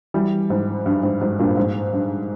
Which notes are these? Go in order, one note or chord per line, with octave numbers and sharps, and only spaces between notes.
E3 G3
G#2
G2
G#2
G#2
G2 A#2
G#2
G2